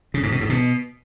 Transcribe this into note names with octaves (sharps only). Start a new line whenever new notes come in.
C#3
G#2
B2
G#2
B2